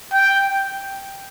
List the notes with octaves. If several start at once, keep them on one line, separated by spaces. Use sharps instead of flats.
G5